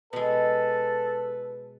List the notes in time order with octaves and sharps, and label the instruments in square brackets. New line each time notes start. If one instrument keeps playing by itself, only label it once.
[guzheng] B2 G#3 [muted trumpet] A4 [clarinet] B4